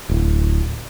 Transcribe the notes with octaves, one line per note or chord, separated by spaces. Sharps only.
D1